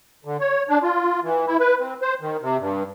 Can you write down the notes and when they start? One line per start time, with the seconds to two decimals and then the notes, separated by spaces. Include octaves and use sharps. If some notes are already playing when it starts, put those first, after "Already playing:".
0.25 D3
0.40 C#5
0.69 D4
0.82 F4
1.23 E3
1.47 E4
1.60 B4
1.80 C4
2.02 C5
2.21 D#3
2.41 C3
2.59 G2